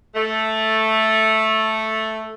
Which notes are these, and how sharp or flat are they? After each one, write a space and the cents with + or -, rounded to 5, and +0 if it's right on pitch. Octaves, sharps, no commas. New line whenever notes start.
A3 +0